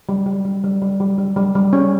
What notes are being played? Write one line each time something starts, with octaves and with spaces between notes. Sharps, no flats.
G3
G3
G3
G3
G3
G3
G3
G3
G3
C#4